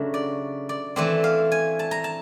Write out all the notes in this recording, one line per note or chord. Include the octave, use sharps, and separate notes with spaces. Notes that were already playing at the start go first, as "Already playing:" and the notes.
Already playing: C#3 F#3 A3 D4
D5
D5
E3 A3 C4 D5
F5
G#5
A5
A#5
A5